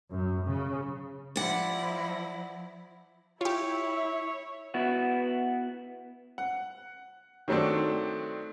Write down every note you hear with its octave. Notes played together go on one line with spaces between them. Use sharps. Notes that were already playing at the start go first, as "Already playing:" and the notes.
F#2
C#3
F3 E4 D5 F#5
E4 F4 G4 C#5
B3 E4 F#4
F#5
D#3 F#3 A3 C4 D4